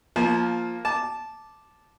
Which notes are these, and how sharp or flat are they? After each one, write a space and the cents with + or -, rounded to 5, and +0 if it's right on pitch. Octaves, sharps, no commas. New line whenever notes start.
F3 +0 A#3 +5 A5 -30
A5 -10 D6 +0